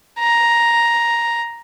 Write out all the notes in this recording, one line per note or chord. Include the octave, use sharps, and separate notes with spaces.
A#5